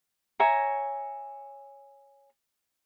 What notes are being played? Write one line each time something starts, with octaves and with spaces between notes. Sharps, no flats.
C#5 E5 G#5 A#5